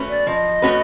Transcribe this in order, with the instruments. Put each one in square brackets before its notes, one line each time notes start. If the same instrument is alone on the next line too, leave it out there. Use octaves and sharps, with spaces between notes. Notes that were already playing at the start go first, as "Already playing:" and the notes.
Already playing: [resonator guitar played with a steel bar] A3 C#4 F#4 B4
[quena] D5
[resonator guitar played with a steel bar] F3 [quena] D#5
[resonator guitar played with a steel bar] A3 C#4 F#4 B4